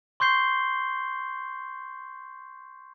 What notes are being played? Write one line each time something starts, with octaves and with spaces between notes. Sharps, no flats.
C6 C#6 G6 C7 G7